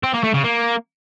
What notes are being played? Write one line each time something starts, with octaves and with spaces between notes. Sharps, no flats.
C4
A#3
A3
C#3
A#3